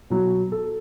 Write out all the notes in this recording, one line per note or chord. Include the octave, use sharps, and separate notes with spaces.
B2 F#3
A4